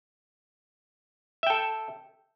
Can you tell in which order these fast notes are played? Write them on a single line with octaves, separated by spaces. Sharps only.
E5 G5 A4